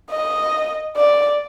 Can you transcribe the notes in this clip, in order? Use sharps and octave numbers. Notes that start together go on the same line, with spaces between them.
D#5
D5